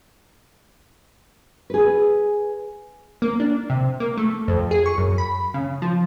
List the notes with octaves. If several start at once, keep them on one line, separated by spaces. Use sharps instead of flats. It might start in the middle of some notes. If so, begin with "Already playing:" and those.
G#4 B4
A#3
D4
C3
A#3
A3
F2
G#4
C#6
F#2
B5
C#3
F3